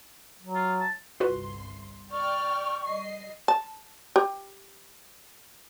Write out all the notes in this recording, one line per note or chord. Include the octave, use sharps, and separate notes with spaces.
F#3
F4
A5
G1 C2 F4 F#4 B4 C6
D5 G5 C#6 F6
G3 D#5 C7
A5
G4